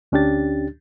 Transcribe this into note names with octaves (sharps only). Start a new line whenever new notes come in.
D2 C#4 D4 G4 A6